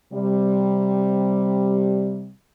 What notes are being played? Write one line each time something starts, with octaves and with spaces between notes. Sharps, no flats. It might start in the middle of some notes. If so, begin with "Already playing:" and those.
C3 G3